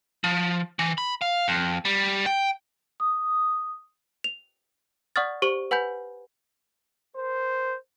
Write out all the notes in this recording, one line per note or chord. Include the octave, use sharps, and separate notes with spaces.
F3
E3
B5
F5
F2
G3
G5
D#6
F7
D5 F#5 C#6 D#6 F6 A6
G4 C5 C#6 F#7
B4 F#5 G#5 B5 G6
A#4 C5